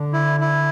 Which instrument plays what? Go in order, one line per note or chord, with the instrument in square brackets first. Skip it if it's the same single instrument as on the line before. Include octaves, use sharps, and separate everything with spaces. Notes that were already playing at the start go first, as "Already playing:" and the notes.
Already playing: [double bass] D3
[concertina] E4
E4